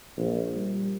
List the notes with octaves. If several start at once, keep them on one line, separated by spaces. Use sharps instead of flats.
A#1
G3